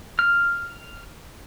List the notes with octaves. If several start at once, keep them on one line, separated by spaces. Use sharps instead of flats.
F6